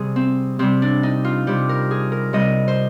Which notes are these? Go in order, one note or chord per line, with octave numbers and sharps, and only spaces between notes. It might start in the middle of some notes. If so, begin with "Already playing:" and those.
Already playing: C3 G3 G#4
C4
C3 G3 C4
D4
D#4
F4
C3 G3 G4
A#4
G#4
A#4
C3 G3 D#5
C5